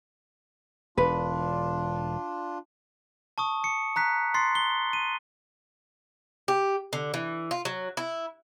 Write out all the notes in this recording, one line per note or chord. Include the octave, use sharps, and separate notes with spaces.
E1 D4 F4 B4
A5 C#6 D#6
C#7
A#5 F#6 B6
C6 A6 C7
G7
D#7
G4
D3
E3
F4
F#3
E4